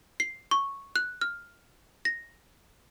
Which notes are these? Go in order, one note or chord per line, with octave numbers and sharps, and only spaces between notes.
C7
C#6
F#6
F6
A#6